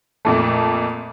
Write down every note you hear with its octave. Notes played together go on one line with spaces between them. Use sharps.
F2 A#2 A3